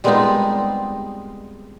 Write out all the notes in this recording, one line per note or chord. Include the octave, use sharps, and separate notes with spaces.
G3 G#3 B3 C4 D#4 F4